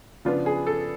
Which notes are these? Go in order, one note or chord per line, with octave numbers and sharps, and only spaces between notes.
C#3 F3 B3 D4 F4
G#4
A4